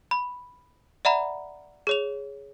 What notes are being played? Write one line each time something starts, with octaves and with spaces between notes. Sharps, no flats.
B5
D5 E5 F#5 A#5 B5
G#4 C#5 F7